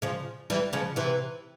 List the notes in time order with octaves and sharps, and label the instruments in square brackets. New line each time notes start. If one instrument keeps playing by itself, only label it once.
[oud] C#3 F3
E3 G3
C#3 F3
C3 E3